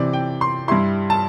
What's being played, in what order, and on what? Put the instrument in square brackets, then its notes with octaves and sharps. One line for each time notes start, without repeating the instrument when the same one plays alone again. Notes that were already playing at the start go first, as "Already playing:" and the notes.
Already playing: [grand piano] C3 E3 C4 D5
G5
C6
G2 G3 E4 C6
A5